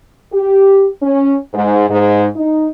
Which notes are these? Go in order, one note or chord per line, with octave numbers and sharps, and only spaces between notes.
G4
C#4
G#2
G#2
D#4